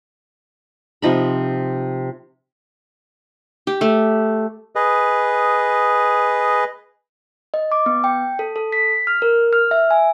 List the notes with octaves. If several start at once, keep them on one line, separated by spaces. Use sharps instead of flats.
C3 F3 D#4 B5
G4
A3
G#4 B4 D#5
D#5
D6
B3
G5
A4
A4
B6
F6
A#4
F6
E5
G#5